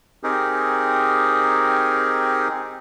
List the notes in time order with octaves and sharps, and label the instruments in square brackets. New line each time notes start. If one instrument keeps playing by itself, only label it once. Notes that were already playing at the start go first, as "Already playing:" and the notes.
[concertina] C4 D#4 G4 G#4 A#4